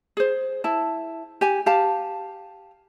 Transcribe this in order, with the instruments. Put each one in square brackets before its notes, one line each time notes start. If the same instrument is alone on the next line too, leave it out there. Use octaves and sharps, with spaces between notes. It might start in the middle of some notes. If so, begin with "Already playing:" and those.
[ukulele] G#4 C5
E4 A5
G4 G#5
G4 F5 A5